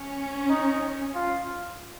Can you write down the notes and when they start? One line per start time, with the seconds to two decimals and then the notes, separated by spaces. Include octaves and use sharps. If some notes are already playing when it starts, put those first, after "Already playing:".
Already playing: C#4
0.49 D#4
1.14 F4